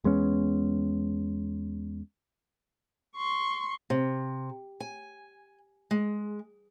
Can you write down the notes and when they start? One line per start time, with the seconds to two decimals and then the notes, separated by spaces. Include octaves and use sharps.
0.04 E2 G#3 B3 C#4
3.17 C6 C#6
3.90 C3
4.80 G#5
5.91 G#3